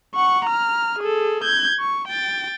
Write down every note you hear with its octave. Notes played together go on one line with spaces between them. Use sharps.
F#5 C#6
A#5 F6
G#4 A4
G6 G#6
C#6
G5 A6